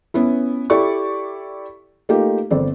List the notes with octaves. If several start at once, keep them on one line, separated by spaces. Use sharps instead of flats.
B3 C#4 E4
E4 G4 A4 D5 C#6
A3 A#3 D#4 F4 G4
G1 C4 D5